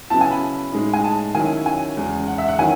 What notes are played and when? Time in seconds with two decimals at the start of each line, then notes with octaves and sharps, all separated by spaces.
0.10 C#3 F#3 B3 E4 A5
0.21 G#5
0.31 B5
0.72 A2 G#3 D#4
0.93 G#5
1.04 A5
1.35 D#3 F#3 C#4 E4 G#5
1.66 G#5
1.97 E2 C#3 G#3
2.28 F#5
2.38 E5
2.48 F#5
2.59 D#3 F#3 C#4 E4 G#5